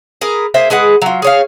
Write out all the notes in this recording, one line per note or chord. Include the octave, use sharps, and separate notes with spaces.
G#4 A#4 B4
A#3 G#4 C5 E5
G#3 G#4 B4 F#5
F#3 F4
G#4 C#5 F5